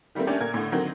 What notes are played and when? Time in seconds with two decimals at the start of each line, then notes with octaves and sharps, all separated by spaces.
0.15 D#3 G3 A3 A#3 C4
0.27 A3 A#3 C#4 D4 G4 A4
0.40 A#2 A#4 G#6
0.54 A2 D3
0.72 D3 D#3 F#3 A#3 C4